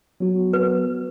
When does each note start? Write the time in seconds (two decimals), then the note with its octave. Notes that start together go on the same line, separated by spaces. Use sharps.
0.20 F#3 B3 F#4
0.53 F#3 B3 F#4 B4